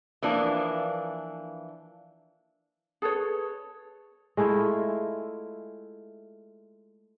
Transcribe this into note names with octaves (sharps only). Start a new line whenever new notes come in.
E3 F3 A#3 D4
G#4 A4 B4 C#5
G#3 A3 E4 F4